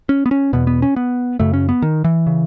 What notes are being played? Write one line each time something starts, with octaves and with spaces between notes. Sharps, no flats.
C#4
B3
C#4
E2 B2 B3
B3
C#4
B3
F#2 C#3 A3
C#4
B3
D#3
E3
C#3